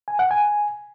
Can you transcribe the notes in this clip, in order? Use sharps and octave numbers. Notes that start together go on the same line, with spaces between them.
G#5
F#5
G#5